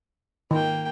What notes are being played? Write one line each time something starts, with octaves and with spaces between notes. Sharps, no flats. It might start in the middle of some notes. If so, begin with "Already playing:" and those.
D#3 A#3 G5